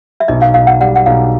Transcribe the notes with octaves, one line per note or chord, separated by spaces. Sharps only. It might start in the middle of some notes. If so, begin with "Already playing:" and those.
E5
B1 D#5
F5
B1 F5
F#5
G3 F#5
F#5
B1 F5